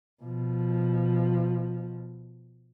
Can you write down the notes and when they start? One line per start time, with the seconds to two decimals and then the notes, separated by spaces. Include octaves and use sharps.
0.22 B2 F3